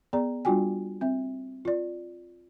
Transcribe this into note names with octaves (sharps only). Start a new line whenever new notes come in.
B3 G#4 D5 A#5
G3 D4 F4 F#4 G5 G#5
C4 E5
F4 D5